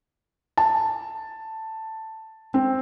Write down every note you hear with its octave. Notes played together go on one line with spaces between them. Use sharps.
A5
C4